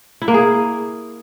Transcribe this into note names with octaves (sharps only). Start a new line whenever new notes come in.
E4
A#3
G#4